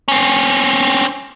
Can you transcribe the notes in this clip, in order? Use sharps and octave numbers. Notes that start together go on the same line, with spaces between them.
C4 C#4